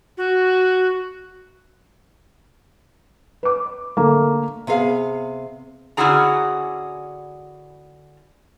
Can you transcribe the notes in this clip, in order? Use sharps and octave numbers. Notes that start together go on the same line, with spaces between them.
F#4
B4 D6
D3 A3 A#3
C3 B3 G#4 F5
D3 C#4 E4 F#4 G#4 A#5